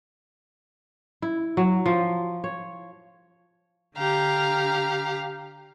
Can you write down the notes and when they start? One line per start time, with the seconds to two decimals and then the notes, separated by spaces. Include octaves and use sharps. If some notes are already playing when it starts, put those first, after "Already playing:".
1.22 E4
1.57 F#3
1.86 F3
2.44 C#5
3.96 D3 G4 F5 A#5